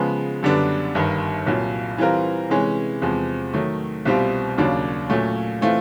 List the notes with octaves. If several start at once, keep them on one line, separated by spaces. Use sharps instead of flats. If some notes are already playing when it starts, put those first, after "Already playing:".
Already playing: C#3 F3 G#3 B3
F#2 D3 G3 B3 D4
G1 G2 D#3
C2 A#2 F#3
E3 G3 C4 F4 A#4
C3 E3 G#3 C#4
E2 C3 F3 G#3
D#3 F#3 A3
C2 B2 G3 C4 F4
D#2 C#3 F#3 A#3 D4
A#2 F#3 A3 C#4
E3 A3 C4 F4